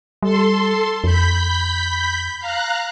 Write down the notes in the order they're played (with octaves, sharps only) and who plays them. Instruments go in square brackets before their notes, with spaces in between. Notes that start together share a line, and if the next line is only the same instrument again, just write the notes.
[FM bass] G3 [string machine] A4 C6
[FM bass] F2 [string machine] B5 G6 B6
[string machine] F5 A#5 F#6